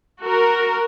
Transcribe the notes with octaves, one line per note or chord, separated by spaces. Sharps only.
F#4 A#4